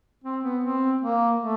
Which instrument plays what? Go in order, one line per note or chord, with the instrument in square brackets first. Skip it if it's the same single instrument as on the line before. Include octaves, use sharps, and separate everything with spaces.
[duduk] C4
B3
C4
A#3
A3